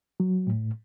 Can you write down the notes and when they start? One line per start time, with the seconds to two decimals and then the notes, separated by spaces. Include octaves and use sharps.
0.20 F#3
0.47 A2